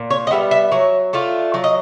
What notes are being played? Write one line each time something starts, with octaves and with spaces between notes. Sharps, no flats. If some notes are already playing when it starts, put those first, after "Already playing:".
Already playing: A#2
C#5
D#5
G3 B3 E5
E5
F#3 C#5
A3 D4 F4
F#3 D5
D#5